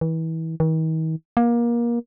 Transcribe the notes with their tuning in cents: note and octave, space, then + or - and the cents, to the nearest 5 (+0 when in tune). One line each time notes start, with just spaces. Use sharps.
E3 -30
D#3 +45
A#3 +25